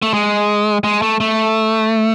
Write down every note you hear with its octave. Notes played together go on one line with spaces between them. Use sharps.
A3
G#3
G#3
A3
A3